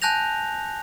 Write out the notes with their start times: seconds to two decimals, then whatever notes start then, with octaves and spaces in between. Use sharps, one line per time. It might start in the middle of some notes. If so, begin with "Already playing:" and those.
0.02 G#5 A5 F#6 G6 A#6 F7